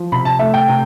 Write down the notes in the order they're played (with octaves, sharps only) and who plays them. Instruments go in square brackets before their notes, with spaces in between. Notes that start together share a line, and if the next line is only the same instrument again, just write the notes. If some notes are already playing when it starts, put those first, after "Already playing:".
Already playing: [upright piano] F3
C3 B5
A5
A3 E5
G5
C3